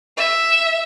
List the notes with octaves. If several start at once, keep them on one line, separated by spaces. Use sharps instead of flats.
E5